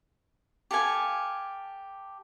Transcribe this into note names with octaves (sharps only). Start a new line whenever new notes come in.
G4 A4 F5 G#5